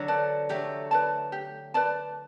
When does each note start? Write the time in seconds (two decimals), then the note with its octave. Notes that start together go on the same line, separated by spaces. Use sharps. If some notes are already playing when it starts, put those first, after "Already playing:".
Already playing: D3 F#3
0.08 B4 D5 A5
0.49 F#3 A3 G4
0.91 B4 D5 A5
1.32 G4
1.74 B4 D5 A5